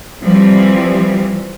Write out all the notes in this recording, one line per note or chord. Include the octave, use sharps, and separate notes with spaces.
E3 F3 G3 C4